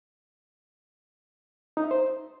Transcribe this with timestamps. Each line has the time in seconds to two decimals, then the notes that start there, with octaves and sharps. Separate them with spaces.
1.77 D#4
1.84 E5
1.91 C5